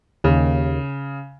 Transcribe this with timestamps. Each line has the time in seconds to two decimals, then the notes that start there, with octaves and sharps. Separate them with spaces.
0.24 D#2 C#3